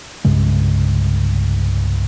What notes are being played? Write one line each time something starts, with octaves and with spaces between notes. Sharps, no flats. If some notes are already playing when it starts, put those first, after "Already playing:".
C2 G2 C#3 G#3